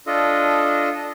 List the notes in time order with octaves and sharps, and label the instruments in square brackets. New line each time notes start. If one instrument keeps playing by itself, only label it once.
[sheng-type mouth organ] D4 F4 A4 D#5